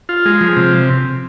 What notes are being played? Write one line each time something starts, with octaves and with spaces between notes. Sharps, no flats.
F4
G#3
F3
C3